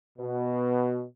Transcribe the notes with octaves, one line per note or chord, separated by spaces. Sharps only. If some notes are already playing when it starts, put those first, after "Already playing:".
B2